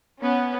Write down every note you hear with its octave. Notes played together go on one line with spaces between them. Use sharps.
B3 C#4